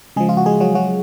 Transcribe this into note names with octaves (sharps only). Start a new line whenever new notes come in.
C#3 F3 G#3 G#4
F4
F#4
G#3 G#4
F#3 F#4
F#3 F#4